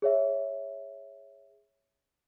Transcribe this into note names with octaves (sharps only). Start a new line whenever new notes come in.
G#4 C#5 E5